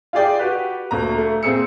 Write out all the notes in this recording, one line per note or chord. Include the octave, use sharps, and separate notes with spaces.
F4 G4 G#4 D5 G5
F#4 G4 B4
D2 A#2 A#5
A3
A#2 C4 G#4 E6 C#7